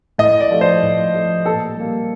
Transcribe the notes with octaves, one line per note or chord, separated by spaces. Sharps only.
A2 D#5
D5
F3 A3
C5
A2
F3 A3
A#2 A4
G3 A#3